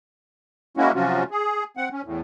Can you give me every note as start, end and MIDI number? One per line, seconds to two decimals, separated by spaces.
0.77 0.92 56
0.77 0.92 58
0.77 0.92 61
0.77 0.92 64
0.77 0.92 66
0.95 1.24 48
0.95 1.24 53
0.95 1.24 54
0.95 1.24 61
0.95 1.24 65
0.95 1.24 66
1.31 1.64 68
1.77 1.89 60
1.77 1.89 78
1.92 2.02 61
2.05 2.21 40
2.05 2.21 45